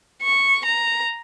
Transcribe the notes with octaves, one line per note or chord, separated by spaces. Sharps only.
C#6
A#5